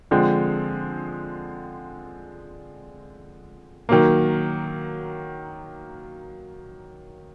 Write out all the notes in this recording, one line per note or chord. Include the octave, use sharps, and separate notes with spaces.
D3 F3 G#3 C4
D#3 F#3 A#3